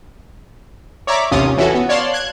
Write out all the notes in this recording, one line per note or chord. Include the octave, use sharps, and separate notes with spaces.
C#5 D5 E5 A#5 D6 B6
A1 D#2 C3 C#4 F4 D#6
E3 C#4 E4 F#4 A4
B3
C#5 D5 F5 A5 C6
F#6 G#6